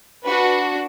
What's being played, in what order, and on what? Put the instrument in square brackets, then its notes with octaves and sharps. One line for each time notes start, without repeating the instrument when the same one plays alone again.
[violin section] D4 F#4 B4